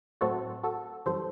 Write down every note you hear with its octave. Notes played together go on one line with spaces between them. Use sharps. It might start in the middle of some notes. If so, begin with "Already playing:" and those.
A2 F#3 A3 C4 F#4 A4
F#4 A4
F#2 E3 G3 A4 C5